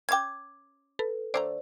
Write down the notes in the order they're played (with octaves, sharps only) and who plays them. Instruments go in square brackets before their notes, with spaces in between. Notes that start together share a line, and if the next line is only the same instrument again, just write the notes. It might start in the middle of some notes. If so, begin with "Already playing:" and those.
[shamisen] C#4 F5 G5 [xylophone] D6 G#6
[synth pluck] A4 B4
[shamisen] D3 A3 A#5 [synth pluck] C5 D5